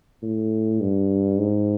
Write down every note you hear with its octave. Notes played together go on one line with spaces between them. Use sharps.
A2
G2
G#2